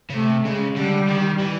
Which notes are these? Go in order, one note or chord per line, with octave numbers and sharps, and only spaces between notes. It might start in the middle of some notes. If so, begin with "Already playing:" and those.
C#3
C3 A3
C#3 G#3
D3 G3
D#3
E3